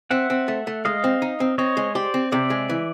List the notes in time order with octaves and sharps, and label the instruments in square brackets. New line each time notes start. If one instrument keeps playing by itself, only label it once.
[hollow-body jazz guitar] C4 [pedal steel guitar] E5 F#5
[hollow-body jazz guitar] C4
A3
A3
[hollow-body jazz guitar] G#3 [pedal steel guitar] D#5 F5
[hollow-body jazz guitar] C4
D#4
C4
[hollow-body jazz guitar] C4 [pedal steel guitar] C#5 D#5
[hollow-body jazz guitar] G#3
[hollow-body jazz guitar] G4 [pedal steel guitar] C5 D5
[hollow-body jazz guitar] C4
[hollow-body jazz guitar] C3 [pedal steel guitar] D5 E5
[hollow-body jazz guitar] G#3
E3